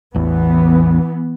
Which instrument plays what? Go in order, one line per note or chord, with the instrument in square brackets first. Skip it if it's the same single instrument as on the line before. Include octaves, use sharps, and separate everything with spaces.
[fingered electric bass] A1 E2 [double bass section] E3 B3